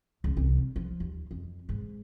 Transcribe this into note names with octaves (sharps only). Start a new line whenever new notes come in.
C#2
C2
D#3
F3
D#2
F2
G#2